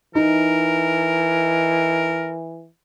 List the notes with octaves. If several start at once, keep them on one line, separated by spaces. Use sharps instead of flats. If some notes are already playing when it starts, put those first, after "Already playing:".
E3 D#4 A#4